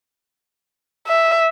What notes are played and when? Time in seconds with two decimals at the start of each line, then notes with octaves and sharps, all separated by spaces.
1.07 E5